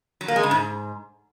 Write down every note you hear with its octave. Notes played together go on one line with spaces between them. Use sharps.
F#3
A#3
G#3
C#3
G#2